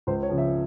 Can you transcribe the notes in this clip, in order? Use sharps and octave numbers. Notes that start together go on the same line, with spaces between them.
C#2 C5
C#5
C#3 F3
E5